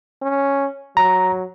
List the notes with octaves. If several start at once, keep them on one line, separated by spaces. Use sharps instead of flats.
C#4
F#3 A#5